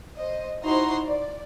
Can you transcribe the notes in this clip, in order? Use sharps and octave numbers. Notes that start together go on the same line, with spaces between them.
C5 D#5
D#4 E4 F#4 C5 A#5 C6
D5